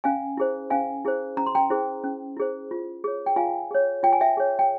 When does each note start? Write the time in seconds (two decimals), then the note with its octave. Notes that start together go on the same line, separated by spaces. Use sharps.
0.04 C#4 F5 G#5
0.37 E4 G#4 C5
0.70 C#4 F5 G#5
1.05 E4 G#4 C5
1.37 C#4 A#5
1.46 C6
1.55 G5 A#5
1.70 E4 G#4 C5
2.04 C#4
2.37 E4 G#4 C5
2.71 F4
3.04 G#4 C#5
3.26 G5
3.36 F4 F5 G#5
3.71 G#4 C#5
4.03 F4 G5
4.13 G#5
4.21 E5 G5
4.37 G#4 C#5
4.59 G5